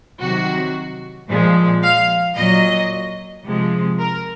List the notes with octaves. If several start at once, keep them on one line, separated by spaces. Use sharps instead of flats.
C3 D#3 F#3 F#4
A#2 F3 G#3
F5
A#2 F#3 D#5
C3 F3 G#3
A#4